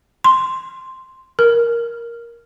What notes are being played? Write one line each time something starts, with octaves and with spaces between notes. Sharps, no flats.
C6
A#4